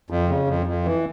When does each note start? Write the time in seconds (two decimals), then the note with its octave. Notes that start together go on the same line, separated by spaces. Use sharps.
0.10 F2
0.29 C#3
0.48 F2
0.67 F2
0.85 E3